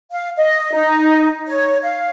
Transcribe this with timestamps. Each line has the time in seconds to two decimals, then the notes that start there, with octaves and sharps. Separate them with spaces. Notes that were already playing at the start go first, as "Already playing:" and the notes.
0.11 F5
0.37 D#5
0.73 D#4
1.47 C#5
1.83 F5